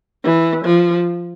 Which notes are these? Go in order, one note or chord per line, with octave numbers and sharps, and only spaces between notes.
E3
F3